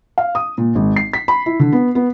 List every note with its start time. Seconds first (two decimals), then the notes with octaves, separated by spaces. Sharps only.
0.18 F5
0.35 D#6
0.58 A#2
0.75 G#1
0.96 C7
1.13 B6
1.28 B5
1.46 E4
1.60 D3
1.73 B3
1.95 B3